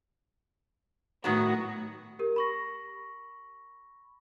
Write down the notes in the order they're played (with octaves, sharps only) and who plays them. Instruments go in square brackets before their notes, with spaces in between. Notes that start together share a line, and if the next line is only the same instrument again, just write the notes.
[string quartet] A2 F#4 [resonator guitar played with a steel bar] D#3 F#3 B3
[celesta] G4 A#4
B5 C#6 A#6